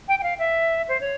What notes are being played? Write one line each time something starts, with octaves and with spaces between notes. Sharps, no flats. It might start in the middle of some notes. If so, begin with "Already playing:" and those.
G5
G5
F5
E5
C5
C#5